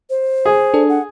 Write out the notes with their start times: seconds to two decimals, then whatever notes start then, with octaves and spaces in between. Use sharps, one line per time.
0.10 C5
0.45 G#4
0.74 D4 A4
0.89 F#5